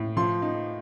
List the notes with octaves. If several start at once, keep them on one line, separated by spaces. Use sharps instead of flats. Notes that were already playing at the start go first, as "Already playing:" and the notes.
Already playing: A2
F3 C6
D#4